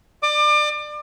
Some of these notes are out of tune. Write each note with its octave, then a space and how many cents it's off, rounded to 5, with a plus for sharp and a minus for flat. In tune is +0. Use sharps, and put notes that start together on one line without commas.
D5 +30 D6 +30